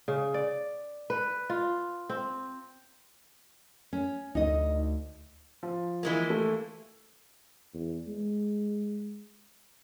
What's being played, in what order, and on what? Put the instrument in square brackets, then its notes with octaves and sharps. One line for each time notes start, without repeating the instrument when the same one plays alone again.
[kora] C#3
D5
B4
F4
C4
[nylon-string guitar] C#4
[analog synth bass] D2 [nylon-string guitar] D#4 D#5
[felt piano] F3
[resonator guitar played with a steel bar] E3 G#3 A#3
[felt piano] A3
[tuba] E2
G#3